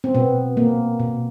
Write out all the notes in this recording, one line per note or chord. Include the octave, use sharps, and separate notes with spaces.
C4
B2 B3
A#3
B2